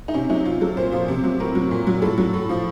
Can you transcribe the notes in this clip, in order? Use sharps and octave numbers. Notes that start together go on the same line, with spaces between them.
D#4
C3 C#4
F#3 D#4
C3 F4
F#3 A4
A#2 C5
F3
C3
F#3
A2 A#4
F#3
A#2
F#3
A2 A4
F#3
A2
F3